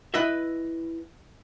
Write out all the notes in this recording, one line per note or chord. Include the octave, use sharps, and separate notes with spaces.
E4 B4 D#5 E5